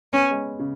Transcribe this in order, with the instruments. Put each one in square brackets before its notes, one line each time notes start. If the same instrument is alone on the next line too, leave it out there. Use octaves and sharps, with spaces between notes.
[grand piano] B3 [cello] C#4
[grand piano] G#3
C#3